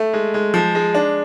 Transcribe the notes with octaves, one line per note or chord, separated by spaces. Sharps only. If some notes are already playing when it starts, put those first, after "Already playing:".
Already playing: A3
G#3
G#3
F3
G#3
D4